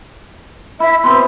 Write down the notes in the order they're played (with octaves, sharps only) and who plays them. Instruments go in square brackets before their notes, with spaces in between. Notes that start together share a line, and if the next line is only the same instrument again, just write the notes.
[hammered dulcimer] E4 [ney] E5
[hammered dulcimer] B2 C4 [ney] C6